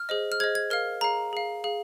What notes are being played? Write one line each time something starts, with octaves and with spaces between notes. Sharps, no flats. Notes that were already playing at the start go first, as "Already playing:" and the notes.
Already playing: F6
G#4 C5 D#5
F6
G#4 C5 D#5 G#6
G#6
A#4 F5 F6
G#4 F5 A#5
G#4 F5
G#4 F5